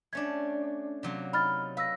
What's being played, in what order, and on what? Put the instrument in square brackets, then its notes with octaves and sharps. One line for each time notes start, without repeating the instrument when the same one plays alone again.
[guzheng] A3 C#4 D4 [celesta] G#6
[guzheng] C3 F#3 A#3
[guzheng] D#4 [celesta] B5 F6 A6
[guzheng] B4 [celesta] F5 E6 A#6